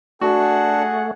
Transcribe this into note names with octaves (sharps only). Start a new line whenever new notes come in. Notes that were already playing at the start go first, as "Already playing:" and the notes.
A3 D4 F#4 G#4 F#5